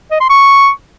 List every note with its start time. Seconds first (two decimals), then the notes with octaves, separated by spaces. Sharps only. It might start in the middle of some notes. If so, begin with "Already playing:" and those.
0.11 D#5
0.20 C6
0.30 C#6